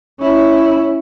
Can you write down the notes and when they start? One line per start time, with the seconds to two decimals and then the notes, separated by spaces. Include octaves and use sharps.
0.20 C#4 E4